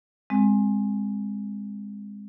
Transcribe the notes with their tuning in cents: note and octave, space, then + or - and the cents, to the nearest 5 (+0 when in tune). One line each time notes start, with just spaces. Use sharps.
G#3 -20 C4 +0